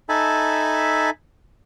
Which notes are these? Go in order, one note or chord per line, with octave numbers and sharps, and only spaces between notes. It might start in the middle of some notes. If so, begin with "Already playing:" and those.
D#4 A4 E5 G#5 A5 B5